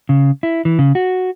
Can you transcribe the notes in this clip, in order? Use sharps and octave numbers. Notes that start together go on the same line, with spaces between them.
C#3
E4
E3
C#3
F#4